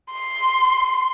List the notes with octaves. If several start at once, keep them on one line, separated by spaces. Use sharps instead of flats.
C6